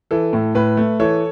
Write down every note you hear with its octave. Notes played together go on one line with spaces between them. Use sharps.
E3 A4
A2
A2 B4
A3
E3 A4 C#5